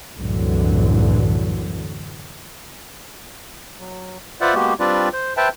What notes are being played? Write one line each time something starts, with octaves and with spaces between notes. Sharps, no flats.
C2 F#2 A2 D3 E3 F#3
F#3
F4 B4 C5 D5 E5 F#5
G#3 A#3 B3 F#4 G4
G3 C4 D4 F4 B4 D5
C5
B4 C5 E5 G5 A5